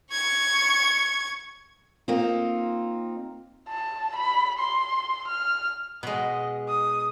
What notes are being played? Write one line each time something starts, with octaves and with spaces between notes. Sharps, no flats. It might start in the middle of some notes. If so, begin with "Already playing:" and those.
C#6 G#6
A#3 C4 D#4 F4
A5
B5
C6
F6
B2 G#3 D#5
D#6